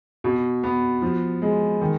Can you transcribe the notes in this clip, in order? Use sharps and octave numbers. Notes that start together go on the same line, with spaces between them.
B2
B3
F3
G#3
D#3